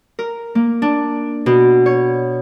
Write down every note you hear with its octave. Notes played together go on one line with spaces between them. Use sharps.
A#4
A#3
D4
B2
C#5